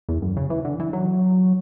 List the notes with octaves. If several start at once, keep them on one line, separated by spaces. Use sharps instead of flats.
E2
F#2
C#3
E3
D3
E3
F#3